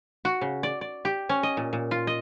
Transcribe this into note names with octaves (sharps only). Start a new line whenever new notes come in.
F#4
C#3
D5
D5
G4
C#4
D#5
A#2
A#2
F4
D#5